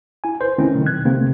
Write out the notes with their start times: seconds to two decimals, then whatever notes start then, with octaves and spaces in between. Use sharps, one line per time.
0.24 E4 G#5
0.41 B4 C5
0.58 D#3 A3 C4 C#4 E4
0.73 B2 D3 D#3 F#3
0.86 F#6 G#6
1.05 C3 D#3 A3 A#3 C4